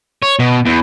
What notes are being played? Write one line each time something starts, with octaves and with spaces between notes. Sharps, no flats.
C#5
B2
E2